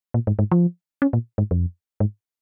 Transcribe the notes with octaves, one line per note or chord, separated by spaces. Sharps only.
A#2
G#2
G#2
F3
C#4
A#2
G#2
F2
G#2